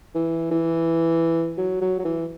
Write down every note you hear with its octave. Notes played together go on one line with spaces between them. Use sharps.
E3
E3
F#3
F#3
F#3
E3